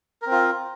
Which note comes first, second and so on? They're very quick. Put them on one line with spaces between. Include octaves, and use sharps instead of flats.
A#4 C4 F4